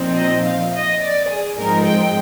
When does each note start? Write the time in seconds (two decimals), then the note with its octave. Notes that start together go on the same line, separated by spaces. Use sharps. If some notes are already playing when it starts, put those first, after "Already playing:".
Already playing: A#2 F3 C4 D#4
0.16 D#5
0.45 F5
0.73 D#5
1.02 D5
1.29 G#4
1.58 G#2 F3 G#3 C4 D#4 A#4
1.86 G5